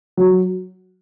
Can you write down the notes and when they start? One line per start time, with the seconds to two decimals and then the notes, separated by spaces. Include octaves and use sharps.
0.17 F#3